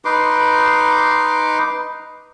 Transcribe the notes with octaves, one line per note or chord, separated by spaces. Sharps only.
D#4 B4 C6 D6